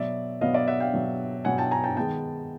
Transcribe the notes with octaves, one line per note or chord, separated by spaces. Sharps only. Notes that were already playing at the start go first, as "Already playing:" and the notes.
Already playing: B2 F#3 B3 D5 E5
B2 F#3 B3 D#5 F5
D5 E5
E5 F#5
F5 G5
B2 F#3 B3
B2 F#3 B3 F#5 G#5
G5 A5
G#5 A#5
G5 A5
D#3 G#3 B3 G5 A5